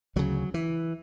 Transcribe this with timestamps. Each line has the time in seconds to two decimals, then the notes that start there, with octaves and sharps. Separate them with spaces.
0.16 D2 C#3 F#3
0.54 E3